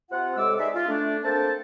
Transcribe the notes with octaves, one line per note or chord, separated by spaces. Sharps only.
C3 F4 F#5
A2 C3 G#3 A4 D6 E6
D#4 G#4 B4 D5 E5
F4
A3 D4
A#3 C4 D4 A4 G5 A5